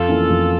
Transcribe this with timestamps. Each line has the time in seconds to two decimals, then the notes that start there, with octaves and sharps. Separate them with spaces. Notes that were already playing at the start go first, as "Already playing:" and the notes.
Already playing: F2 F4 A4
0.08 E3 A#3 C#4
0.29 F2